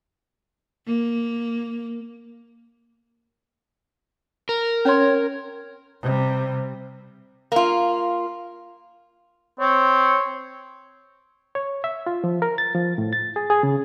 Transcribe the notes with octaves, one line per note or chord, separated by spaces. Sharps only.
A#3
A#4
C#4 C#5 C6
C3 G3
A#3 F4
C4 C#5
C#5
E5
F4
F3
A#4
A6
F3
A2
A6
G#4
G#4
C#3